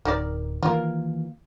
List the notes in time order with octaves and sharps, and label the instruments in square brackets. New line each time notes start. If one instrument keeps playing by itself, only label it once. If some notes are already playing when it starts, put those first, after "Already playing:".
[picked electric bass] D1 [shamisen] D#3 A#4 D5
[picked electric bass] D#3 E3 A#3 [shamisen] F4 A#4